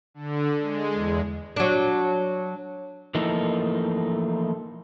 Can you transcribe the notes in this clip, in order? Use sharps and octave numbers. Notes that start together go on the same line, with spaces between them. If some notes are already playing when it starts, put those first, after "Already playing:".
D3
G#3
E2
F#3 D4
E3 F3 A3 A#3 D#4